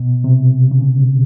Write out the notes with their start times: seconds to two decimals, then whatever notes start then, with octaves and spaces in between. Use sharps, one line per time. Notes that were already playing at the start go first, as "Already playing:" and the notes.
Already playing: B2
0.24 C3
0.71 C#3